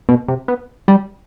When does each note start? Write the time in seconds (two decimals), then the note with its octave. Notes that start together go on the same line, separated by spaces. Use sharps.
0.09 B2
0.28 C3
0.48 B3
0.88 G3